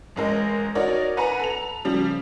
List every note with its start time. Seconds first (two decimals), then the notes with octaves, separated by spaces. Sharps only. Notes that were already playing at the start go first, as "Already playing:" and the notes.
0.16 A1 G#3 A#4
0.75 D#4 F#4 A#4 C#5 D5
1.17 B4 F#5 G#5 A#5
1.39 A4 F7
1.85 C#3 F3 G3